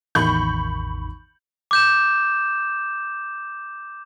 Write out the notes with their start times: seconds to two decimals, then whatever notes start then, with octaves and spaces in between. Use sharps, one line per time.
0.15 A1 E2 D#3 B5 C#6 G6
1.71 D6 G6 E7